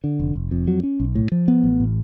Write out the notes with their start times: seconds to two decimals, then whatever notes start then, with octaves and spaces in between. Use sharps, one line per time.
0.04 D3
0.19 F1
0.35 F1
0.51 F2
0.68 F#3
0.83 C#4
1.00 B1
1.15 A2
1.32 F3
1.48 B3
1.64 A1
1.80 A2